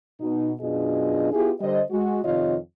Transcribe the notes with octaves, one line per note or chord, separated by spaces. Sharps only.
B2 D#4
F#2 B2 D4 F4 G#4 D#5
B3 E4 F4 G4 G#4
D3 G3 C5 D#5
G#3 F#4
F2 C3 D#3 F4 C#5 D#5